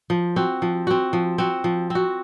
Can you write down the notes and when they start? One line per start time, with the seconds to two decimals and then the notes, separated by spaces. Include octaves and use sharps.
0.10 F3
0.36 C4 F#4
0.62 F3
0.87 C4 F#4
1.13 F3
1.38 C4 F#4
1.64 F3
1.90 C4 F#4